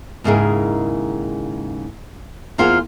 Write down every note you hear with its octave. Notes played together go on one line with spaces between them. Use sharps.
D#2 G#2 C#3 E4 G#4 A#4
E2 A#3 F4 G#4 C5 F#5